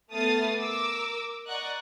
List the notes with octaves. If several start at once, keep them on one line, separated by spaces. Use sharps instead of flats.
A3 B3 D#6 F6 A6 C7
A#4 D6 E6
D5 D#5 F#5 A#5 C#6 F#6